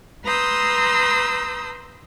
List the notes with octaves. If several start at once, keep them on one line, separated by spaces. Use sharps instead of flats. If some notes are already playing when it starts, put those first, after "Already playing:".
B4 A#5 C6 D#6 E6 G6